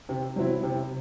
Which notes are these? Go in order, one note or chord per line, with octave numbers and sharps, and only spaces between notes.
C3
F#3 C4 E4
C3